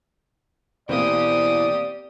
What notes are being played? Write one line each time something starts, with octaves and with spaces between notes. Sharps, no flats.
B2 E3 A#3 C4 G4 D5 D#6